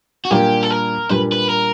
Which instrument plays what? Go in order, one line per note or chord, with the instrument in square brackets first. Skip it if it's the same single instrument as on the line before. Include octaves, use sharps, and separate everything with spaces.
[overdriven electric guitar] F#4
[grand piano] A#2 G3 A#3 D4 [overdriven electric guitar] G4
[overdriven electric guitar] A4
A#4
[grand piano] A#2 G3 A#3 D4 [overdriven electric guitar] B4
[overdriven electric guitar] B4
A#4